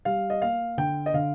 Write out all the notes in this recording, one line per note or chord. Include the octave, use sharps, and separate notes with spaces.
G3 F5
D#5
A#3 F5
D3 G5
D#5
D3 F5